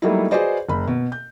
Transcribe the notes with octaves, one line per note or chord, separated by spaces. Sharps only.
F#3 G3 A3 A#3 D#4 E4
F#4 G#4 B4 C5 D5 D#5
F#1 B5
B2
G6